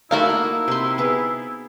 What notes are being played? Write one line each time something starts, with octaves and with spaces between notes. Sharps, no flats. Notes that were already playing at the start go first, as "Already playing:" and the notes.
A3 D#4 E4 F#4 A4 A#4 F5
A#3 D#4
C3 C6
B3 G#4